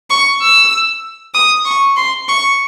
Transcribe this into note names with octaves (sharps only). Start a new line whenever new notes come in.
C#6
E6
D#6
C#6
C6
C#6